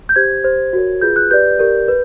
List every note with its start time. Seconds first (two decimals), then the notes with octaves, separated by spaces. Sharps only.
0.09 G6
0.16 G4 C5 G#6
0.44 G4 C5
0.73 F#4 A#4 C#5
1.02 F4 G#4 B4 G6
1.16 F#6
1.31 G4 B4 D5 G6
1.59 G4 A#4 D5
1.88 B4